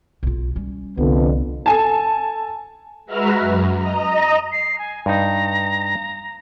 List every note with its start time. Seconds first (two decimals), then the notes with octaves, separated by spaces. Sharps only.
0.23 B1 F4
0.56 G3 C#4
0.97 C2 F2 D3 B3
1.66 A4 G#5 A5
3.06 G#3 F#4 B4 E5 A#5 F6
3.40 F#2
3.76 D#5 A#5
4.52 C7
4.79 G#5
5.06 G2 D#4 A#5